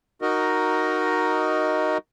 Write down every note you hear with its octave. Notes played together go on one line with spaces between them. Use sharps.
D#4 F#4 A#4 D#5